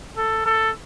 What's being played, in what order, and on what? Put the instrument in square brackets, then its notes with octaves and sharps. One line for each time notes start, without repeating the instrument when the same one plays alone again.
[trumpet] A4
A4